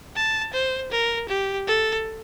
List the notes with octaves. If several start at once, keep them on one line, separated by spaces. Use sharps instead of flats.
A5
C5
A#4
G4
A4